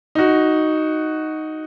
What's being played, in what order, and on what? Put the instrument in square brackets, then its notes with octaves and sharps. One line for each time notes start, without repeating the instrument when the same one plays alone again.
[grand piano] D#4 F#4